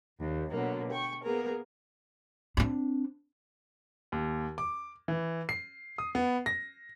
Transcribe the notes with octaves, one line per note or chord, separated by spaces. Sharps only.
D#2
B2 D3 F#3 A#3
G5 C#6
A#3 B3 G#4 A#4
C4 D4
D#2
D6
E3
C7
D#6
B3
A#6